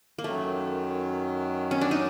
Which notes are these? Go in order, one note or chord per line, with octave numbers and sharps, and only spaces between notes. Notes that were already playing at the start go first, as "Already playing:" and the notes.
A#3
F#2 D#3 F#3 A3
C#4
D4
D#4